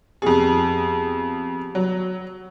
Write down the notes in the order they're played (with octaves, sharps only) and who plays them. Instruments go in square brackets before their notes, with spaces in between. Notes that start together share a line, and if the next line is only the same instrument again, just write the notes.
[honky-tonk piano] F2 G#4 [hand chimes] B3 G4
[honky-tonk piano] F#3